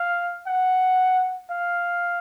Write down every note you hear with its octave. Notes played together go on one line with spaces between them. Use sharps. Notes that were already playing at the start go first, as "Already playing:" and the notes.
Already playing: F5
F#5
F5